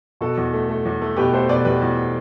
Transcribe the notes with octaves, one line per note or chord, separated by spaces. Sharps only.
B2 F#4 A4
E2
A3
A3
E2
A3
B2 G4 B4
A3 A4 C5
B2 B4 D5
E2 G4 B4
E2